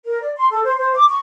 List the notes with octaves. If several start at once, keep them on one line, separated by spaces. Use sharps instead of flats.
A#4
D5
C6
A4
C5
C5
D6
C#6